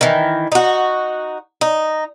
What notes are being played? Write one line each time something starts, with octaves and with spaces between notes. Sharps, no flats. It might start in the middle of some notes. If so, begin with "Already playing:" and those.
D#3 E3
D#4 F#4
D#4